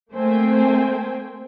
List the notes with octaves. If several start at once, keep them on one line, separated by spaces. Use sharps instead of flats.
A3 A#3 C4 C5 G5 G#5